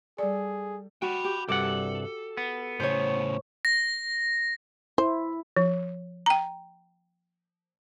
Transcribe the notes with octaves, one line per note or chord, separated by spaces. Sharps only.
G3 G#4 A4 D5
F#4 G5 B5
G4
C2 G2 A4 F#5 D6
B3
A2 C#3 C5 C#5
A#6
E4 C5
F3
G5 A#5